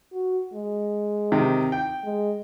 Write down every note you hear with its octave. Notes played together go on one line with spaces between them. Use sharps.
F#4
G#3
C3 D#3
G5
G#3